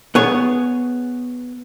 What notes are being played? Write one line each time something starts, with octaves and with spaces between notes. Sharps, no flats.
B3 G#4 C#5